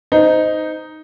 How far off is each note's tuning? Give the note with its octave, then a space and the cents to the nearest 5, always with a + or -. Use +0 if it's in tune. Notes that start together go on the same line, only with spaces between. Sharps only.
D#4 +0 C5 -25